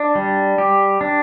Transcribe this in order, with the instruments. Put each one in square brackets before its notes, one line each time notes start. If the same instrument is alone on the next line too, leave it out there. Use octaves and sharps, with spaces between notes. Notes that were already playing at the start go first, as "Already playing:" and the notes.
Already playing: [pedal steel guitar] D4
G3
G4
D4